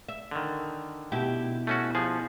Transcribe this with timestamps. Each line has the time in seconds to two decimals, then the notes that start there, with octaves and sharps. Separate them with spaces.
0.09 E5
0.31 D3 D#3
1.12 B2 E4 G4
1.67 A3 C#4 F#4
1.95 F3 G#4